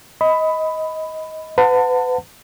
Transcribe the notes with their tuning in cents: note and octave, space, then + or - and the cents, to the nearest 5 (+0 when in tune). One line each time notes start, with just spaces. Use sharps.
D#5 +20 B5 +10
B4 +35 F#5 -25 A5 +30